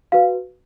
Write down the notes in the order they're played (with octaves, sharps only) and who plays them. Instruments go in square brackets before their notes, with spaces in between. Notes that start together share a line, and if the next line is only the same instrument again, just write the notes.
[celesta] F#4 B4 F5